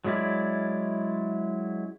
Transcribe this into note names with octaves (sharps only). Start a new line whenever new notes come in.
F#3 G#3 C#4 E4 D5